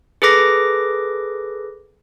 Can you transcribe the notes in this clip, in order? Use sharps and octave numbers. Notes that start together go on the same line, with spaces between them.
G#4 A4 B4 D6 A#6